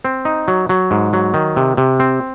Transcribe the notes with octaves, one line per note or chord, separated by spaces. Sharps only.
C4
D#4
F#3
F#3
G#2
F#3
D#3
C3
C3
C4